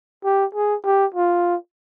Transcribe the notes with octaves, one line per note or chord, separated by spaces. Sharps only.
G4
G#4
G4
F4